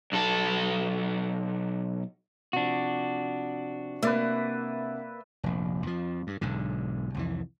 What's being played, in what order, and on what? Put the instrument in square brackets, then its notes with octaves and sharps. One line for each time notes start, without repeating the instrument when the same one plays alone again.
[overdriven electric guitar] B1 A4
[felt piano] C3 F3 [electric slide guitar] D4 F#4
[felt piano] C3 [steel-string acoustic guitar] A#3 [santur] B4 D5 E5
[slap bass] F1 A#1
F2 F3
G2
B1 G#2 D3
C2 F2 E3